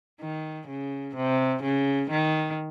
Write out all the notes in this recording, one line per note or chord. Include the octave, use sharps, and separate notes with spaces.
D#3
C#3
C3
C#3
D#3